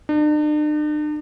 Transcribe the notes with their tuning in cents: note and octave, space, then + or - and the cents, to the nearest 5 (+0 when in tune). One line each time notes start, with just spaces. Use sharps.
D4 +45